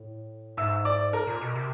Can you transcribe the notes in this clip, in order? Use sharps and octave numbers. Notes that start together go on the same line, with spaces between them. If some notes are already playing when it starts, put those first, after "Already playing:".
Already playing: A2
G#2 E5 E6
D5 D6
A#4 A#5
A#2
B2
C3